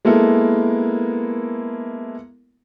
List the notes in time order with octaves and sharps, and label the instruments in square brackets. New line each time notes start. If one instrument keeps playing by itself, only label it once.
[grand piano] G#3 A#3 B3 E4 A4 A#4